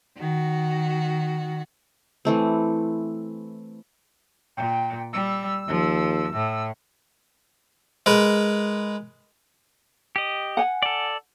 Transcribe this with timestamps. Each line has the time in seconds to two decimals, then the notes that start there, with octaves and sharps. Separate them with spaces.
0.19 D#3 F#4
2.25 E3 A3 C4
4.57 A#2 G5
5.13 G3 E6
5.68 D#2 F3
6.33 A2
8.06 G#3 A#4 B4
10.16 G4 D#5
10.57 F#5 G#5
10.83 A4 D5